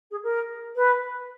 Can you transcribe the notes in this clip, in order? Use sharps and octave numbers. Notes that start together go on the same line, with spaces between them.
G#4
A#4
B4